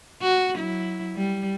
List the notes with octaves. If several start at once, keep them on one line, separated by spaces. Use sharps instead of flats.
F#4
F#3 E4
G3